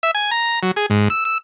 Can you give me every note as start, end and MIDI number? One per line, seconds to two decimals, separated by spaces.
0.03 0.11 76
0.15 0.31 80
0.31 0.59 82
0.63 0.71 54
0.76 0.86 68
0.90 1.08 44
1.10 1.24 88
1.25 1.38 88